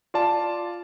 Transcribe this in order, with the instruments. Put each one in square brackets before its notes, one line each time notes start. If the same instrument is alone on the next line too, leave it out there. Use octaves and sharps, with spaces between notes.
[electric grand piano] F4 D5 A5